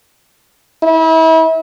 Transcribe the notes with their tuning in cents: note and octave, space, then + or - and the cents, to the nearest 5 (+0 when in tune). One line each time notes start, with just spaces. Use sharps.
E4 -35